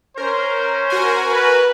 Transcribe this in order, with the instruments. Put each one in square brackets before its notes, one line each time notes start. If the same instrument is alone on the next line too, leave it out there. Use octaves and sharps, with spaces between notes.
[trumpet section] C#4 C5 [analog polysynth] A#4
[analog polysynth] F#4 A#4 G#5
[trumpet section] B4